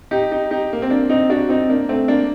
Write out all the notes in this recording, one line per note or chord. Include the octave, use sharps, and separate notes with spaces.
D#4 G4
D#4 G4
D#4 G4
A#3
C4
A#3 D4
C4 D#4
D4 F#4
C4 D#4
A#3 D4
A3 C4
A#3 D4